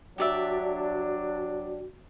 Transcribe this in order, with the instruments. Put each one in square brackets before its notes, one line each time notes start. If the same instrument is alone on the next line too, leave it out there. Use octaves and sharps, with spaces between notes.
[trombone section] F#3 D4 [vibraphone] F#4 [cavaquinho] G4 D5 E5